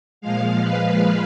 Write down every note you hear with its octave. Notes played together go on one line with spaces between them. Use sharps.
A#2 F3 G#3 F5
B4